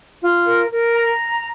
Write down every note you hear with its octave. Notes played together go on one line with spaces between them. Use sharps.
F4
A#4
A#4
A#5